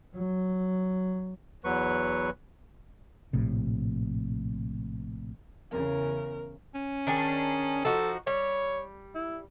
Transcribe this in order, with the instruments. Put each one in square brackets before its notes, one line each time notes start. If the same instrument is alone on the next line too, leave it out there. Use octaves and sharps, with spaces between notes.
[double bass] F#3
[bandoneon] E2 F#3 B4 C#6
[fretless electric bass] A#1 A2 C3
[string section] E2 C#3 [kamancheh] A#4
[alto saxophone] C#4
[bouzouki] D#3 D4 G#4
[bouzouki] F3 D#4 F#4 [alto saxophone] A4
[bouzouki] G3 [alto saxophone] C#5
[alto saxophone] E4